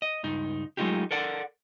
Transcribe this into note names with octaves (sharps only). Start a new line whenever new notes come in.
D#5
C#2 G2 D#4
F#3 G#3 A3 D#4 F4 G4
A4 A#4 D5 F#5